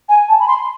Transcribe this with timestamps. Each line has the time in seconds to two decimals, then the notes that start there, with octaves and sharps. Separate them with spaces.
0.09 G#5
0.28 A5
0.40 B5
0.47 C6